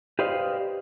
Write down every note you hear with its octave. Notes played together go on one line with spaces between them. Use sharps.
G4 B4 C5 D5 D#5 F5